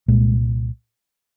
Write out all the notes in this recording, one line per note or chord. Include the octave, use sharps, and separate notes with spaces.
C2 A#2 G#3